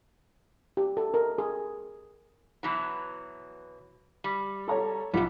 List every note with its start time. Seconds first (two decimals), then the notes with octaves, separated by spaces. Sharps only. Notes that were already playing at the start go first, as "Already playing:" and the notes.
0.77 G4
0.97 A4
1.14 A#4
1.38 G#4
2.63 B2 E3 F#3
4.24 G3
4.68 A4 C#5 A5 A#5
5.14 B1 F#2 F3 G3 F4 F#5